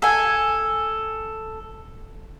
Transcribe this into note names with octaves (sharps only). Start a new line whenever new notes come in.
A4 G#5